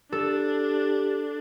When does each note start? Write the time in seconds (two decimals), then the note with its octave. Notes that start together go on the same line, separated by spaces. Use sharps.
0.12 D4 G4 A4